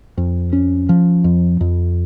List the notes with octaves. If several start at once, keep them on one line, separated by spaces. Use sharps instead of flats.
F2
C#4
F3
F2
F2